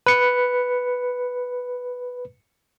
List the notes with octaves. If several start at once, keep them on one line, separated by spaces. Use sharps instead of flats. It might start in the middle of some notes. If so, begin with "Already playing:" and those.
B4 C#7